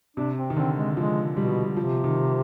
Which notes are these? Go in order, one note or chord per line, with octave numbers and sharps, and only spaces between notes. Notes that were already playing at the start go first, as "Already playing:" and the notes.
C3 D4
C4
D#3
D3 C4
G#3
F3 G#3
B2 G3
C3 F3
D#3